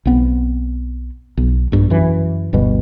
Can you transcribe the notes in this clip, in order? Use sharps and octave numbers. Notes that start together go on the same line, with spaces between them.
B1 B3 C4
B1
A#1 G2
F#2 E3
G1 D2 G2 B2